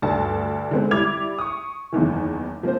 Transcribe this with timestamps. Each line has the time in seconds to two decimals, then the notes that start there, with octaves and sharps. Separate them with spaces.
0.02 D2 G2 D4 A4 A5
0.71 D3 G#3 B3 C4
0.91 G3 E4 D6 G#6 F7
1.39 C#6 D#6
1.93 F#1 E2 D#3 E3
2.63 F3 A#3 C4 C5